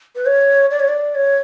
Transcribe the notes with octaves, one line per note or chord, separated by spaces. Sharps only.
B4
C#5
D5
C#5
D5
C#5